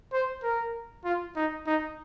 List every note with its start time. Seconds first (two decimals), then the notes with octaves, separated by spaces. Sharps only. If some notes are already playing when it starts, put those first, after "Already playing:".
0.12 C5
0.43 A#4
1.05 F4
1.36 D#4
1.67 D#4